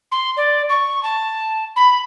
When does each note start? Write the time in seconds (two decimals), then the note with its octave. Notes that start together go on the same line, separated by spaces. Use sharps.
0.12 C6
0.37 D5
0.69 C#6
1.03 A5
1.76 B5